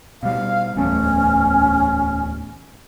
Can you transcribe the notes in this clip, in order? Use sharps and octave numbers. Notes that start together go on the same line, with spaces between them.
B2 G3 F5
D1 E2 A3 C#4